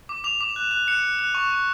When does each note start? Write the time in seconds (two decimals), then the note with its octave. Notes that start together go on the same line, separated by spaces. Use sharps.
0.09 D6
0.24 D6 F7
0.41 D6
0.56 F#6
0.71 F#6
0.87 F#6 C#7
1.03 F#6
1.19 F#6
1.35 C#6
1.50 C#6